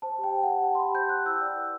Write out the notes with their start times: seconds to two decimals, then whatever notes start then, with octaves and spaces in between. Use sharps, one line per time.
0.02 C5 A5
0.18 G4
0.24 G5
0.33 C5
0.43 F#5
0.49 G4
0.64 G4 A5
0.75 C6
0.79 G4 B5
0.94 C5 G6
1.09 C5 F#6
1.26 E4 E6
1.41 D5
1.57 B4